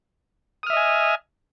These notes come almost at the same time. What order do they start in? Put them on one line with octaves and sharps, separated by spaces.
D#6 F6 E5 D#5 G#5